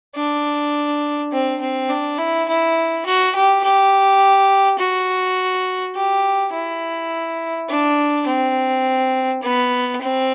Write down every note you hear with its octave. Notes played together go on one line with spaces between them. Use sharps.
D4
C4
C4
D4
E4
E4
F#4
G4
G4
F#4
G4
E4
D4
C4
B3
C4